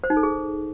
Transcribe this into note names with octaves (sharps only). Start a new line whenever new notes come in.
C5
D#4
A4
G#4